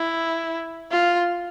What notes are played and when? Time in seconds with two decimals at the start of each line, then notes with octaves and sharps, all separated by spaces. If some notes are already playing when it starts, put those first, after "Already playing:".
Already playing: E4
0.91 F4